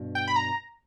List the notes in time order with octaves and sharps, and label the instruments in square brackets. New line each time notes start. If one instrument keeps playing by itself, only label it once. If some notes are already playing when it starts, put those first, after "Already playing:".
Already playing: [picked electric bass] G2 B2
[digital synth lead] G5
B5
A#5